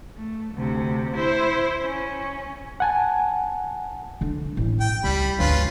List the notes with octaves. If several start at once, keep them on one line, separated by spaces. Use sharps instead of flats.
A3
D2 C3
E4 C5
C#4
F#5 G#5 A5
D3 D4
A1
G5
C#2 G3 G5 B5
G#1 D2 C#4 F4 B4